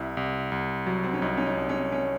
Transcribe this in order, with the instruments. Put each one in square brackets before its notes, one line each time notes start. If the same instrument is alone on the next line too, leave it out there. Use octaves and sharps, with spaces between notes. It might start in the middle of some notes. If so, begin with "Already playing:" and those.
Already playing: [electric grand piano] C2 [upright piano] E4
[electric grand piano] C2
C2
F#3
[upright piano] C4
C#4
[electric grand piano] C2 [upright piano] D#4
[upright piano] C#4
D#4
[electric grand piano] C2
[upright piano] C#4
C#4